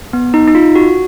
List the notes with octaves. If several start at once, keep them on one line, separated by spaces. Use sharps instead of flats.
B3
D#4
D#4
F4
F#4